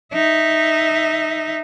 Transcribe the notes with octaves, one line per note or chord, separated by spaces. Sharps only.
D#4 E5